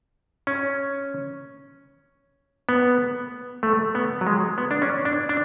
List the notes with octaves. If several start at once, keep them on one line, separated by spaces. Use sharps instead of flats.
C#4
B3
A3
B3
F#3
G#3
B3
D4
C#4
D4
D4